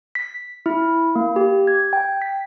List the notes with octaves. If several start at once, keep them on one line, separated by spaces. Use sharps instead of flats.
B6
E4
A#3
G4
G#6
G5
B6